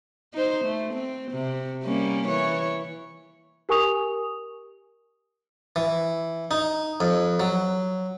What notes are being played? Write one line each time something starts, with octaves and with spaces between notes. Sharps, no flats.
D#4 C5
A3
C4
C3
G3 A#3 C#4
E3 C#5
G4 A#4 G#5 C#6 D#6 F7
E3
D#4
F2
F#3